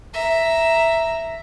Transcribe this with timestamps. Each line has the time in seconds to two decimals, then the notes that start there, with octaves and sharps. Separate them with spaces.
0.14 E5 A#5